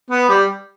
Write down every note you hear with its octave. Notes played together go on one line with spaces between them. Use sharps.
B3
G3